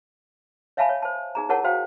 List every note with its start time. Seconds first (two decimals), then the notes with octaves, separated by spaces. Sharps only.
0.77 C#5 E5 F5 G#5 A5 B5
0.89 C#5
1.02 C5 A5
1.35 D#4 G#4 A#5
1.49 E4 G#4 A#4 C#5 F#5 A5
1.64 F#4 C5 F5 G5